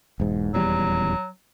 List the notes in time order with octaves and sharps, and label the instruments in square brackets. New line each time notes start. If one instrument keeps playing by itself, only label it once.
[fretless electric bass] E1 G#2
[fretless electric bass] D#1 E2 G3 [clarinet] F#3